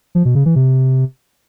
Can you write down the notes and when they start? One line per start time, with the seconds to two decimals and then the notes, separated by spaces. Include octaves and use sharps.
0.15 F3
0.25 B2
0.35 C#3
0.45 E3
0.56 C3